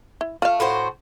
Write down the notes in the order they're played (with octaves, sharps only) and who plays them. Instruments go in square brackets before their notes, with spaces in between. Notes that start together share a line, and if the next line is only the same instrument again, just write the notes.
[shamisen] E4
[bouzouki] A3 [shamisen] F4 F5
[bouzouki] A2 F#4 C5